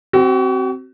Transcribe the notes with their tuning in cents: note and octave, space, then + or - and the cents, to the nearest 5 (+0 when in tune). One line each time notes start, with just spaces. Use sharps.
C4 +0 F#4 +35